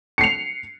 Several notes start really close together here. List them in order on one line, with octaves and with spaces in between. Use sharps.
C#7 C7 F7